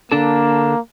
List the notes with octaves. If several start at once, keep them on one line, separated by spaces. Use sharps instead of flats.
D3 A#3 D4 A4